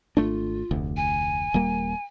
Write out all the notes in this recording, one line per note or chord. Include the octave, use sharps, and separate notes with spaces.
G#1 A3 D4 F4
F1 D2
G#5
D#1 G3 A#3